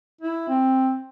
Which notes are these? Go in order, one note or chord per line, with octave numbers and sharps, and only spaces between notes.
E4
C4